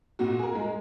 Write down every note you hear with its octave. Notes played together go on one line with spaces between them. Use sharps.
A#2 F#4
G#4
A#4
G#3